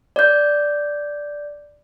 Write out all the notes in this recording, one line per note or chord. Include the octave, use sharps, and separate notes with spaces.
D5 G6